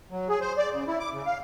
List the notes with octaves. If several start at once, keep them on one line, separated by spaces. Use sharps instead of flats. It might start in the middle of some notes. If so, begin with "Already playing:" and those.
F#3
G#4
C5
D5
C#3
E4
D6
C#3
F5